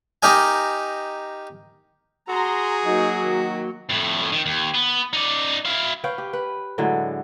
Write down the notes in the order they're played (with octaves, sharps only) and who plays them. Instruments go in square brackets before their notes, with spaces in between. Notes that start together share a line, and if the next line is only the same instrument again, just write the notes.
[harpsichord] D#4 G4 A#4 D#5 G#5
[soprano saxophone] F#4 [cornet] G#4 [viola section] A#5 C6
[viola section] F#3 A#3 [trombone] D#4
[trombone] D#3
[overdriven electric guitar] F2 A2
D#3
D#2
B3
D#4 D5
E4 F5
[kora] B4 C#5 F5 G5
G4
B4
A2 D3 F#3 G#3